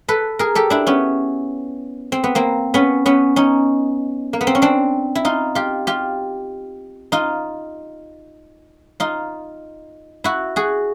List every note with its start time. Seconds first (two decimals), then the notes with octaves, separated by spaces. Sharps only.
0.08 A4 B4
0.39 G#4 A#4
0.55 G4 A4
0.70 D4 E4
0.87 B3 C#4
2.12 C4
2.24 B3
2.35 A#3 C4
2.74 B3 C#4
3.06 B3 C#4
3.36 C#4 D#4
4.33 A#3
4.41 B3
4.47 C4
4.55 C#4
4.62 C4 D4
5.15 E4
5.25 D#4 F4
5.55 F4 G4
5.87 F4 G4
7.12 D#4 F4
9.00 D#4 F4
10.24 E4 F#4
10.56 F#4 G#4